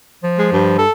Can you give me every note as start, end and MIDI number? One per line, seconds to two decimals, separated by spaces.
0.23 0.78 53
0.38 0.48 56
0.52 0.84 43
0.78 0.92 69